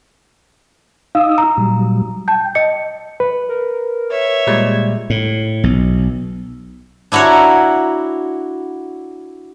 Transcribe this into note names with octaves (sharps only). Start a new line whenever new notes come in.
D#4 F5 D#6 E6
A#5
A#2 F#3 G3
G5 A5 G6
D#5 C#7
B4
A#4
C#5 E5
A#2 G3 G#3 G#6
A2
B1
D4 E4 F#4 A#4 C#5